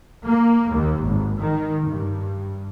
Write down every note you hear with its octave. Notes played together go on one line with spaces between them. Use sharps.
A#3
D#2
G#1
D#3
G2